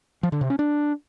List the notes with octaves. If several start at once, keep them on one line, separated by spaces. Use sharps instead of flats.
F3
D3
C3
C#4
D4